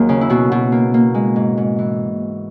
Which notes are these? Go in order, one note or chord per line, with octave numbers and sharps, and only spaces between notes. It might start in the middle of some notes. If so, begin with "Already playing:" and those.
Already playing: D#2 F#3 A#3 G#4
C#3
E4
B2 F#4
B2
A#3
A#3
G#3
G#2
G#2
E3